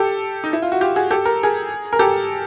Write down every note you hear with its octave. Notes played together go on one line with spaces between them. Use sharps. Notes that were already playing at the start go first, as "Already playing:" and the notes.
Already playing: G4 A4
D#4
E4
F4
F#4
F4 G4
F#4 G#4
G4 A4
A#4
G#4 A#4
A#4
G4 A4